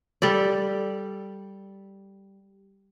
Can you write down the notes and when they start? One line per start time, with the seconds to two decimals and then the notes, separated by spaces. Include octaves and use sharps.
0.22 G3 A4 D5